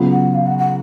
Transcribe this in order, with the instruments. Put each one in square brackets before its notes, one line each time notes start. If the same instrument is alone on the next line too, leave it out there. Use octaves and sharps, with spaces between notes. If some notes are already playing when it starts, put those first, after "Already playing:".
Already playing: [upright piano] C#3 F#3 B3 F4
[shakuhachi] F#5
F5
F#5
F#5